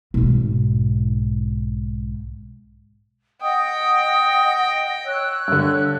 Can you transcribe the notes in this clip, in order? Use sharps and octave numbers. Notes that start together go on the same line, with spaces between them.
B1 G#2
D#5 F#5 G5 D#6
C#5 E6 F#6
G2 D3